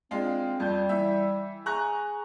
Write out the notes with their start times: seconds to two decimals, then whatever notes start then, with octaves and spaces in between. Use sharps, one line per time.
0.11 G#3 C4 D4 F4
0.60 F2 G3 G6
0.89 E3 E5
1.66 G#4 A#5 C#6 F#6